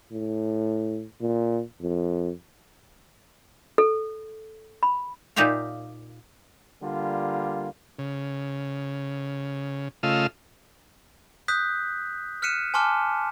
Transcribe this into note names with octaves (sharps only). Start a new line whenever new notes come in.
A2
A#2
F2
A4
B5
A#2 D#4 F4 G4 E5 F5
D3 G3 A#3 F4
C#3
C#3 A3 F4 D#5 F5 E6
D#6 F#6 G6 B6
F6 F#6 B6 C#7 D#7 E7
G#5 A5 C6 D6 F6